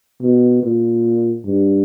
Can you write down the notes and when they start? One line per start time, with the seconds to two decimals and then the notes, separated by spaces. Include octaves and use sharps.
0.22 B2
0.63 A#2
1.46 G2